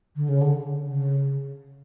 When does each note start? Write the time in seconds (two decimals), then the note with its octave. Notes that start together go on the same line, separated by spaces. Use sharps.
0.16 D3
0.28 C#3
0.41 D3
0.84 C#3